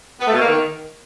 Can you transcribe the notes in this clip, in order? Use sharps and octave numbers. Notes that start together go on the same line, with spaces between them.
B3
A3
B2
A#3
D#3